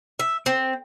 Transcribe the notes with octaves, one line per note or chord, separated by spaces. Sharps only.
E5
C4